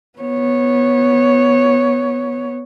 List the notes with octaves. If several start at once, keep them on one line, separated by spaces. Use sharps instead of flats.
B3 C#5